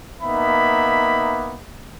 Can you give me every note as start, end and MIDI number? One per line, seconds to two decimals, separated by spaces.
0.22 1.61 58
0.22 1.61 59
0.22 1.61 63
0.22 1.61 76
0.22 1.61 83